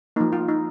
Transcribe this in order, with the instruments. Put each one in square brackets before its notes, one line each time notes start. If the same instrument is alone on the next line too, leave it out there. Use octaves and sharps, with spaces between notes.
[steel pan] F3 A#3 D#4
F4
D#4